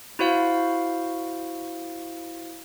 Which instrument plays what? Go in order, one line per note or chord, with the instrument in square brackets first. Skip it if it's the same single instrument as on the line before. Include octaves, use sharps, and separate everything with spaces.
[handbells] E4 F#4 C5 F5